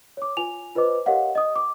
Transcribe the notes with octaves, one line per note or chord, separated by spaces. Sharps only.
C#5 D6
F4 G#5 F7
F4 B4 C5 D#5 D6
G4 A#4 C#5 D#5 F5 F#5
D#5 D#6
D6